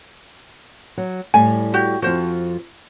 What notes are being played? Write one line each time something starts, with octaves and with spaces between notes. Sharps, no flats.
F#3
A2 G3 G#5
F#4 G4
F2 F3 F#4 C5